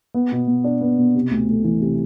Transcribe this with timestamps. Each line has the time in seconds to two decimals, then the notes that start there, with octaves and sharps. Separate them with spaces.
0.14 B3
0.32 B2
0.48 B2
0.64 D4
0.81 B3
0.98 B2
1.15 C3
1.31 D2
1.49 A3
1.64 E3
1.81 C3